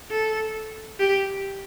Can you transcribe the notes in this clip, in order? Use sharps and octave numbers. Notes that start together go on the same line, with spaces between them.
A4
G4